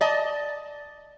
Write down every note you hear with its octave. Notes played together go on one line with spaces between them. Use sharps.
D5 D#5 A5